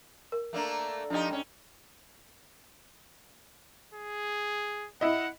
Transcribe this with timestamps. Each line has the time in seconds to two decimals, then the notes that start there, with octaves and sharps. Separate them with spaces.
0.32 A#4
0.53 A3 A#3 D4
1.10 F3 D4 D#4 G4 D#5
1.28 G#2 C#4
3.94 G#4
5.01 E4 D#5 F#5